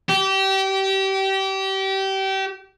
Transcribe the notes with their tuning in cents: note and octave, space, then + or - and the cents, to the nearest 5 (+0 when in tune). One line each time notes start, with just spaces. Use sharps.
G4 -25